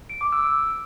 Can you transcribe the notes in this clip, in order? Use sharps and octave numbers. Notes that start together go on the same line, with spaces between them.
D7
D6
E6